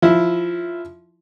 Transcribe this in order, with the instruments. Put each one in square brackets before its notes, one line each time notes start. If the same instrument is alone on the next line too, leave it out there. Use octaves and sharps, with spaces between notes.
[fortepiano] F3 E4